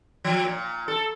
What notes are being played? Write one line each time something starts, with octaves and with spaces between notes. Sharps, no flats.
F3
A#2
A4